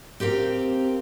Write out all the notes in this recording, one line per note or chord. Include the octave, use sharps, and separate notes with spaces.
C4 G4 A#4 F5